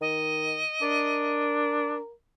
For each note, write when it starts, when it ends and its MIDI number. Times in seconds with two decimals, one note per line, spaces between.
0.01 0.61 51
0.01 1.43 75
0.82 1.97 62
0.82 2.11 70